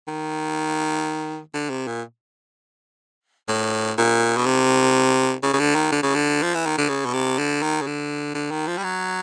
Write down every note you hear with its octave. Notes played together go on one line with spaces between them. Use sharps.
D#3
D3
C3
A#2
A2
A#2
B2
C3
C#3
C#3
D3
D#3
D3
C#3
D3
F3
E3
D#3
D3
C#3
B2
C3
D3
D#3
C#3
D3
D3
D#3
F3
G3
F#3